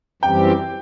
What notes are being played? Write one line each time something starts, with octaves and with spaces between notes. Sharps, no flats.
F#2 E3 G3 C4 G4 G5